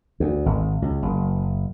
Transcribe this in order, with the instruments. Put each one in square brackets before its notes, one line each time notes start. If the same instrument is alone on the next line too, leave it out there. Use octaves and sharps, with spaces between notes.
[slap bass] D2
G#1
C#2
F#1